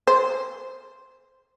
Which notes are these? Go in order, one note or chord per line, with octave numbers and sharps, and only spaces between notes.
C5